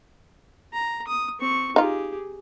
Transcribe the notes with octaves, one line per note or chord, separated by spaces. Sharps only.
A#5
D#6
C4 C#6
D#4 F4 G4 G#4